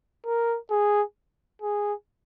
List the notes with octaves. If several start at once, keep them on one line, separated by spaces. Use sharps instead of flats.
A#4
G#4
G#4